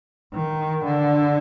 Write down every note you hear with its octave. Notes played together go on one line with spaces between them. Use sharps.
D#3
D3